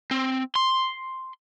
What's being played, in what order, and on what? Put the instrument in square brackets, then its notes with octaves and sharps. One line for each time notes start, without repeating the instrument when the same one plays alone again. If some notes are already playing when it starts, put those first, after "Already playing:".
[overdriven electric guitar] C4
C6